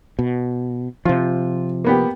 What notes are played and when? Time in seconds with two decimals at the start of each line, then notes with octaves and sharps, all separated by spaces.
0.19 B2
1.05 C3 F3 F4
1.84 A#3 B3 G4